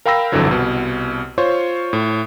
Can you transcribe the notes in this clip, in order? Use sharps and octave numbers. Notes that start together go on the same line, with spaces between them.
A#4 F5 G5 B5 E6 A#6
G1 F2 D3 E3 F#3
C2 B2
F4 C5 C#5 C6 C#6
A2